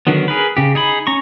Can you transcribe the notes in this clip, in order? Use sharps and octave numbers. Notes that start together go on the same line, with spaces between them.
D3 D#3 F#3 B3
G#4 A#4 B4
C#3 G4
D#4 G#4 B5
C#4 A#5 C#6